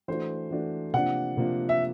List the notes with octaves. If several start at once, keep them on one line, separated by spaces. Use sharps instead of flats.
E3 A3 D4 F#4 C5
E3 A3 D4 F#4
C3 F3 A#3 D4 F#5
C3 F3 A#3 D4
E5